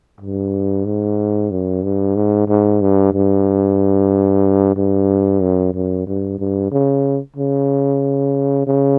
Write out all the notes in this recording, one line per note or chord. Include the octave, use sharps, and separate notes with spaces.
G2
G#2
F#2
G2
G#2
G#2
G2
G2
G2
F#2
F#2
G2
G2
C#3
C#3
C#3